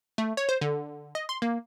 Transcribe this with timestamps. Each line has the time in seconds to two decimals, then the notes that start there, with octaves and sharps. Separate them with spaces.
0.18 A3
0.37 C#5
0.49 C5
0.61 D3
1.15 D#5
1.29 C6
1.42 A#3